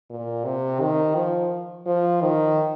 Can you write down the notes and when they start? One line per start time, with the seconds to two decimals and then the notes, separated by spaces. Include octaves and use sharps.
0.10 A#2
0.45 C3
0.81 D#3
1.16 F3
1.87 F3
2.22 D#3